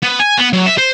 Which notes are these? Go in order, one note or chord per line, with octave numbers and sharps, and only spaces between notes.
B3
G#5
B3
F#3
E5
C5